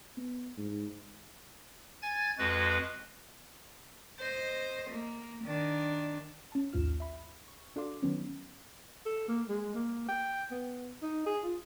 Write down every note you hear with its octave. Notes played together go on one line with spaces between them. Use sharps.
B3
G#2
G#5 G#6 A6
F2 G#3 F#4 B4
C5 D#5
A#3
D#3 D4
C#4 A5
A#1 D#2 G#2 F4 F6 E7
E5 B5
C#6
D4 F#4 A4 F5 C6 D6
D#3 F#3 B3 C#4
A4
A#3
G#3
A#3
G5
B3
D#4
G#4
F4